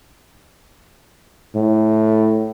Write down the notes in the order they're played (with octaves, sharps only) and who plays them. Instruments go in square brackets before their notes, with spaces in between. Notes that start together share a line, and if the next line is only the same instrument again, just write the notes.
[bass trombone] A2